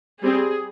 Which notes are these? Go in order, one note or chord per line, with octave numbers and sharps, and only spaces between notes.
G3 C4 G#4